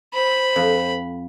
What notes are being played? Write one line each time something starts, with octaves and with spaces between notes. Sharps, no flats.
C5 B5
F2